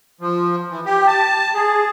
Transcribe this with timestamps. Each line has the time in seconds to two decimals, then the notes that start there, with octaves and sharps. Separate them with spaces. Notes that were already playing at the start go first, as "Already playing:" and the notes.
0.21 F3
0.70 E3
0.86 G4
1.07 A5
1.54 G#4